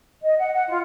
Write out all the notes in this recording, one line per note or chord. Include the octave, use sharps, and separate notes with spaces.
D#5
F#5
F#5
F4